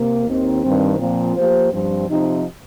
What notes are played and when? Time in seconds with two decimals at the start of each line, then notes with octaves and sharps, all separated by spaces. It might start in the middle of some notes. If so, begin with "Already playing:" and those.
Already playing: C3 A#3
0.26 D#2 D#3 C4
0.62 G2 D#3 C4
0.98 A#2 F3 C4
1.36 F3 A#3 G4 C5
1.72 G2 F3 C4
2.08 C3 F3 C4 D#4